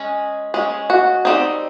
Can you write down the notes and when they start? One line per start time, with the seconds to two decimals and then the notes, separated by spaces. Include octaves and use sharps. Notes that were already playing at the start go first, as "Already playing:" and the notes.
Already playing: G#3 C#4
0.54 G#3 C#4
0.90 F#4
1.25 G3 C4 D#4